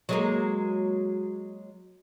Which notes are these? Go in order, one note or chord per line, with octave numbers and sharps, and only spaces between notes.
F#3 G#3 A#3